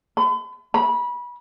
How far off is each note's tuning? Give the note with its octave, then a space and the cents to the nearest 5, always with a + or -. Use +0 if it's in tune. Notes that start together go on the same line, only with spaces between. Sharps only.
B5 +45
B5 -25